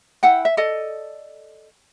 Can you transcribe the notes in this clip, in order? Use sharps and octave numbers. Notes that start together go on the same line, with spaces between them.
E4 F#5 G5
E5
A4 D5 D#5